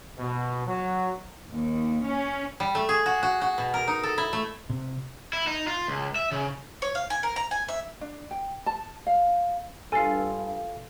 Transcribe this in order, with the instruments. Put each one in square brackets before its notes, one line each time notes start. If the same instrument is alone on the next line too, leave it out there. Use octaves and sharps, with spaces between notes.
[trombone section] B2
F#3
[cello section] D#2
C#4
[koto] G3
A3
G#4
F#4
F#4
F#4
B2
A#4
D#4
A4
E4
A3
[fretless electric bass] C3
[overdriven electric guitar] E4
D#4
F4
C#2
E5
C#3
[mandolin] C#5
F5
G#5
A#4
A#5
G#5
E5
[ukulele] D4
G5
A5
F5
[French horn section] G2 [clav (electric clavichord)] F4 A4 [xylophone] G#5 C7